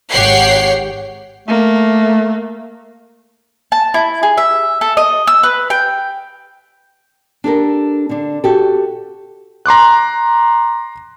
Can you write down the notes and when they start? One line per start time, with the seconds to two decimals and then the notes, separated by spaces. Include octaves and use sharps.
0.11 G#1 G4 C#5 F#5 G5 C7
1.49 A3 A#3
3.72 A5
3.94 E4
4.23 G#4
4.37 E5
4.81 A4
4.97 D#5
5.27 E6
5.43 B4
5.70 G5
7.44 D4 G4 A4 A#4
8.09 D3 D4
8.44 F#4 G4 A4
9.66 A#5 C6 D6 F#6